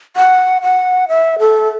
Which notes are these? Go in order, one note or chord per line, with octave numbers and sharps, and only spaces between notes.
F#5
F#5
E5
A4